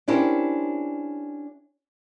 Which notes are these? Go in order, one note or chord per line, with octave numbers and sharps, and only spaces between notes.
C#4 D4 E4 G4 A#4 C5